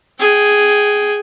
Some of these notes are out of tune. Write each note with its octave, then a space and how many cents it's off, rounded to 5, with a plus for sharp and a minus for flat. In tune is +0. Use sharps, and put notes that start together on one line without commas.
G#4 +0 G5 -25